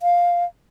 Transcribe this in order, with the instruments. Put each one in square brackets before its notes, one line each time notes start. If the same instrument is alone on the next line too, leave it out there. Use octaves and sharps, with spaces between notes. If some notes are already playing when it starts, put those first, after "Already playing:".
[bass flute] F5